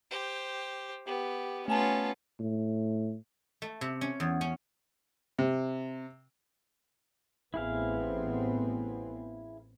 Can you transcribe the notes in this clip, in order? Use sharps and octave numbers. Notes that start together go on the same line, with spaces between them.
G4 C5
B3 G4
A3 B3 C#4 F4 G#5 A5
A2
A3
C3
C#4
E2
C#4
C3
A1 B3 C4 E4 G#4 F5